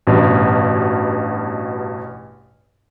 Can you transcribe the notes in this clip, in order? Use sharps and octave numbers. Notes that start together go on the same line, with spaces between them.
A1 G2 B2